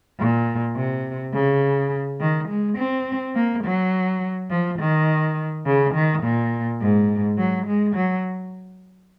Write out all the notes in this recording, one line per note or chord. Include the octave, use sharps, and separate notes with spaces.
A#2
C3
C#3
D#3
G#3
C4
A#3
F#3
F3
D#3
C#3
D#3
A#2
G#2
F#3
G#3
F#3